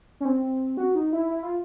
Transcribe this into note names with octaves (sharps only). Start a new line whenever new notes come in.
C#4
C4
F#4
D#4
E4
E4
F4